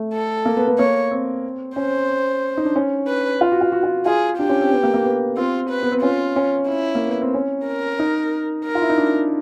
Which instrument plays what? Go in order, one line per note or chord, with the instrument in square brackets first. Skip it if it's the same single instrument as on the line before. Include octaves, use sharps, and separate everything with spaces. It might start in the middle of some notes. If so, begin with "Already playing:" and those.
Already playing: [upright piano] A3
[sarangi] A4
[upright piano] A#3
B3
B3
[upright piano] A#3 [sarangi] C#5
[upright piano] C4
[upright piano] C#4 [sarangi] C5
[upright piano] D#4
D4
C#4
[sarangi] B4
[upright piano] F4
F#4
F4
F#4
F4
[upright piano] F4 [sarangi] G#4
[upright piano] D4 [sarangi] G4
[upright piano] C#4
C4
B3
A#3
A#3
B3
[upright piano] C4 [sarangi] F4
[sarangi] B4
[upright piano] B3
C4
[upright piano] C#4 [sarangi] F4
[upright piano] C#4
[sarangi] E4
[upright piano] A#3
B3
C4
C#4
[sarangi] A#4
[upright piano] D#4
[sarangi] A#4
[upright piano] F4
E4
D#4
D4